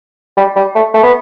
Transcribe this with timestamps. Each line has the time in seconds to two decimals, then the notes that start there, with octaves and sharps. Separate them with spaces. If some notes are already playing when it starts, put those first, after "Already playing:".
0.37 G3
0.56 G3
0.75 A3
0.94 A3
1.03 B3